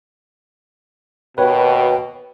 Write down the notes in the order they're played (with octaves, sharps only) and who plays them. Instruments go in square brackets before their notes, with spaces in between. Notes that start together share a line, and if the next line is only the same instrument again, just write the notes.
[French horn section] D#2 B2 [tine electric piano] B4 C#5 [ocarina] G5